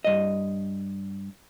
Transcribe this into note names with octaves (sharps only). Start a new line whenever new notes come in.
G2 D#5